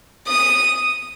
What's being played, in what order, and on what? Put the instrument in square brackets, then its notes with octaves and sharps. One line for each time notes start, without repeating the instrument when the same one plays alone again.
[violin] D#6